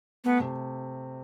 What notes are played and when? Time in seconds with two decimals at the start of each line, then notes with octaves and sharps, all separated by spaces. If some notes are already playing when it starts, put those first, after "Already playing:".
0.24 A3 B3
0.40 C3